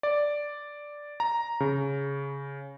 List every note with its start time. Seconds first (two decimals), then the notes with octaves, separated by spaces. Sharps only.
0.03 D5
1.20 A#5
1.60 C#3